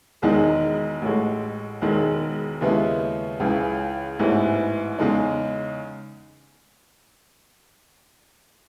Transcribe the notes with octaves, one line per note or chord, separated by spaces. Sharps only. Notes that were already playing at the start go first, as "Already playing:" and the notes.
E1 E2 D#3 G#3 D#4
A1 A2 G#3
E1 E2 D#3 G#3
D#2 C#3 G#3 B3 E4
C#2 C#3 E3
A1 G#2 E3 B3 E4
E2 C#3 G#3 D#4